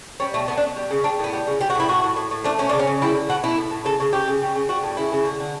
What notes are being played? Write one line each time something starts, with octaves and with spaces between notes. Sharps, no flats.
G3 C#4
B2 A3
A3 B3
D4
B2
G3
C#3
G3 D4
A2 B3
G3
C#3
G3 G4
F#4
A2
E4
A2 F#4
A2
A2
A2
A3 D4
B2 C#4
C#3 D4
C#4
C#3
G3 E4
D3
B2 F#4
B2 E4
A2
A2
C#3 A4
C#3
C#3 G4
C#3
G3
C#3
G3 F#4
A2
C#3 E4
C#3
D3
D3